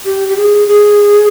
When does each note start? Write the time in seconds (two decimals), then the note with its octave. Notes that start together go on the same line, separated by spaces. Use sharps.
0.05 G4
0.28 G4
0.37 G#4
0.67 G#4